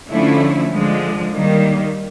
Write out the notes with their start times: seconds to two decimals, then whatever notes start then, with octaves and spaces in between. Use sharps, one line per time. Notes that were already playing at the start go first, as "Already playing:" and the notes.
0.10 D3 F3 A3 C#4 E4
0.72 D3 F3 G#3
1.33 D#3 G3 A#3